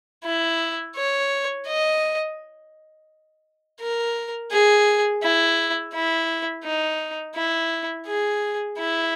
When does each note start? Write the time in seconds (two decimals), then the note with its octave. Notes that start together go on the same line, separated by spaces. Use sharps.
0.25 E4
0.96 C#5
1.68 D#5
3.81 A#4
4.51 G#4
5.23 E4
5.94 E4
6.64 D#4
7.36 E4
8.07 G#4
8.79 E4